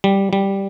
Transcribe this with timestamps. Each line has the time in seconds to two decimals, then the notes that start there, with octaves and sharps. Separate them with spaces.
0.04 G3
0.33 G3